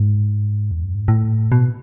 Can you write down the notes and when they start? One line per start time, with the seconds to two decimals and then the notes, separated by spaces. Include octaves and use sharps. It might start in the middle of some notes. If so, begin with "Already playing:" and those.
Already playing: G#2
0.71 E2
0.84 F#2
0.95 G#2
1.08 A2
1.52 B2